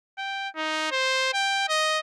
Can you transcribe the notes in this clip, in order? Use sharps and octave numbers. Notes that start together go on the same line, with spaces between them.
G5
D#4
C5
G5
D#5